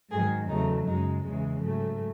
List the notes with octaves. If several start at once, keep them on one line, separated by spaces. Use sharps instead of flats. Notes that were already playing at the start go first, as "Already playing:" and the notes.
G#2 D#3 F#3 G#4
E2 C#3 F#3 A3 D#4
F#2 C#3 G#3 D#4
E2 C#3 E3 G#3
G#2 F#3 A3